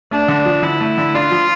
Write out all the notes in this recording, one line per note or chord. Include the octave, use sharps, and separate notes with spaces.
A3 D4
D3
F3
D3 E4
A3
D3
D4 F4
F3